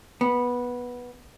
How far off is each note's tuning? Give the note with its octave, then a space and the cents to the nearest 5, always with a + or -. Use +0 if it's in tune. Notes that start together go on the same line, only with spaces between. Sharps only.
B3 -10